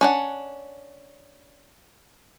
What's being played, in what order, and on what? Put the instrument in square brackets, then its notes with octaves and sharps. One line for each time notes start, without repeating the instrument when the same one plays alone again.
[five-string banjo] C#4 D4 F#5